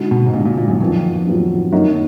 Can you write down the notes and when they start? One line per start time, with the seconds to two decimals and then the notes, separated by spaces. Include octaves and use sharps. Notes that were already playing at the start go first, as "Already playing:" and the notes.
Already playing: D3 G#3 D#4 F#4
0.11 B2
0.26 G#2
0.34 A#2 D3 G#3 D#4 F#4
0.46 A#2
0.58 A#2
0.68 F#2
0.80 F2 D#3 F#3 B3 F4
1.26 D#3 F#3 B3 F4
1.72 F#2 D#3 A#3 D#4